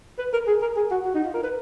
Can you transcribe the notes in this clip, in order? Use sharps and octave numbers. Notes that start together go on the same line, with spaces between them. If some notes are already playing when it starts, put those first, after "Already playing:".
B4
A#4
G#4
A#4
G#4
F#4
F#4
D#4
F4
A#4
B4